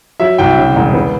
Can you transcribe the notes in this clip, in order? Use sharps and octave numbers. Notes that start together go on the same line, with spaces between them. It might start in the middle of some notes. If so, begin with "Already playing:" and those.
F#3 E5
C2 G5
C#3
E1
B3